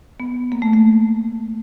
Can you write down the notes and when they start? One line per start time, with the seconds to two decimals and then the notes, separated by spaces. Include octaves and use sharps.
0.20 B3
0.52 A#3
0.62 A3
0.73 A3